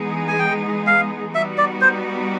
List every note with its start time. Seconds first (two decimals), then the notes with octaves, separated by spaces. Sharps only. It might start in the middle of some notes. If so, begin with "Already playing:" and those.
Already playing: E3 G#3 B3 D#4 G#4
0.28 G#5
0.39 G5
0.87 F5
1.34 G3 B3 D#4 F#4 E5
1.58 D5
1.81 C5